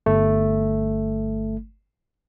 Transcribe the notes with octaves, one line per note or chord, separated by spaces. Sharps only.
G1 A3